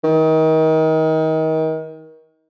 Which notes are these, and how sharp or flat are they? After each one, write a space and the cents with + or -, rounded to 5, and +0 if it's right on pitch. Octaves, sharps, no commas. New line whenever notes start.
D#3 +30